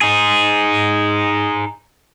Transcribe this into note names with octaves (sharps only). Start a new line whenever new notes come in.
D#4 G#4